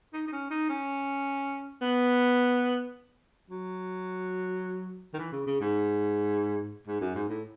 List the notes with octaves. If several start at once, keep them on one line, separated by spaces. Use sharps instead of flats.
D#4
D#4
C#4
D#4
C#4
B3
F#3
D#3
E3
C#3
C#3
G#2
G#2
F#2
G#2
A2